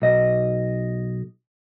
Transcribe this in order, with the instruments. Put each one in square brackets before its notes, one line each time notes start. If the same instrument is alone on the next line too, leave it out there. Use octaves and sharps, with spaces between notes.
[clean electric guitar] B1 D#5